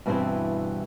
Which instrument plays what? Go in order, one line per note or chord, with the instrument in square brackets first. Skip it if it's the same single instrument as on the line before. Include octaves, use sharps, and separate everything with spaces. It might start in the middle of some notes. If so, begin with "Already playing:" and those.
[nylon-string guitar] G2 B2 E3 G3 C4 E4